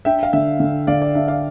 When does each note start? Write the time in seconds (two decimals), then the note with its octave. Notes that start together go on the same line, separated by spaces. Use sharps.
0.05 D4 E5 G5
0.23 F5
0.33 D3 E5
0.60 D3
0.87 D3 D5 F5
1.02 D5
1.15 D4 E5
1.28 D5 F5